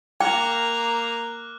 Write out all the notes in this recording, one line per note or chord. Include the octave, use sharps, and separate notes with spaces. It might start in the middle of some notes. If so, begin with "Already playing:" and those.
A#3 G5 A#5 D6 F6 F#6